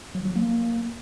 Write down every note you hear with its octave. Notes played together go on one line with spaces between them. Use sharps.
F#3
F#3
A#3